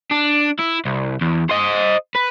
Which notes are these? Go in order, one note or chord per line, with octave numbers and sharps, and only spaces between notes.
D4
E4
C2
E2
C5 D#5
B4